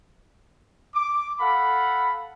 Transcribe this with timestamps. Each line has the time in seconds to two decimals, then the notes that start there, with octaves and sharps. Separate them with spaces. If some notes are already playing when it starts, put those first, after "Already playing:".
0.94 D6
1.40 A4 F5 F#5 B5